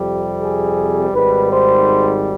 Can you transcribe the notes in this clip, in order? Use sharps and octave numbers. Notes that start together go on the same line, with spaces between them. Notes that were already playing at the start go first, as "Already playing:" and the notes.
Already playing: F2 C3 G3 G4
G#4
G#1 G#2 G3 B4
C5